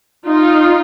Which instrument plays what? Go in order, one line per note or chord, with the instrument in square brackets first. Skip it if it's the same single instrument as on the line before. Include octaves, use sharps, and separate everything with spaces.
[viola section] D#4 F4